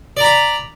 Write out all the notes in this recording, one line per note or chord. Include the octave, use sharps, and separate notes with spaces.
D5 A#5 B5